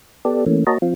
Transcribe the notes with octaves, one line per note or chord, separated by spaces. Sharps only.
B3 G4 A4 D5
E3 A3 A#3 C#4
A#3 F#4 C#5 D#5 A5 A#5
F3 C4 F4